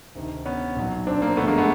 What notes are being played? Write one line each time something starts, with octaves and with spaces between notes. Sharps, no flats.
D2 C3 D#3
B3 C#4
B1 A#2 F#3
C4 D4
A#3 C4
G1 F#2 D3 F3 A3 B3
G#3 A#3
A3 B3